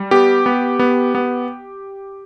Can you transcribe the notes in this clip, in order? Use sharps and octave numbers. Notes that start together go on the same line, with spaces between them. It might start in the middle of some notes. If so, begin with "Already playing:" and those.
Already playing: G3
B3 G4
B3
B3
B3